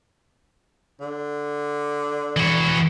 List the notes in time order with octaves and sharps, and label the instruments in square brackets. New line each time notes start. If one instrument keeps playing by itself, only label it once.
[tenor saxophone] D3
[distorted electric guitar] E3 F#4